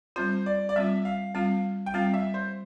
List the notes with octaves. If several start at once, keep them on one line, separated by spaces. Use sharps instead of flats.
G3 C4 F4 C5
D5
D5
G3 C4 F4 E5
F5
G3 C4 F4 F5
G5
G3 C4 F4 F5
E5
C5